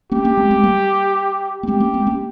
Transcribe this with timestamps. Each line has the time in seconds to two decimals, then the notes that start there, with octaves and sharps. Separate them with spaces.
0.11 A#3 C#4 G4
0.25 A#3 C#4
0.37 G#3 C4
0.51 G#3 C4
0.63 G3 A#3
1.63 A#3
1.67 G#3 C4 G4
1.80 A#3 C#4
1.94 G#3 C4
2.07 A#3 C#4